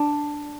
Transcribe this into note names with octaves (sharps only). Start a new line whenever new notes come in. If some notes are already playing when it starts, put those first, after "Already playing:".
Already playing: D4